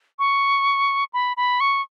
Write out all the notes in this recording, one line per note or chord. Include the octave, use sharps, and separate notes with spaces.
C#6
B5
B5
C#6